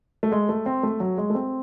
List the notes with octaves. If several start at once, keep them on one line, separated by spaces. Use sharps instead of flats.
A3
G#3
A3
C4
A3
F#3
G#3
A3
C4